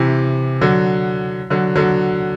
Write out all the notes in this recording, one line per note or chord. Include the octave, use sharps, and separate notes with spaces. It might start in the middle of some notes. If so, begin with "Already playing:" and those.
Already playing: C3 E3
D3 F#3
D3 F#3
D3 F#3